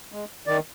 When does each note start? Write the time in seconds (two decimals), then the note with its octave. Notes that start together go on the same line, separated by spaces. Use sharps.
0.12 G#3
0.47 D#3 D5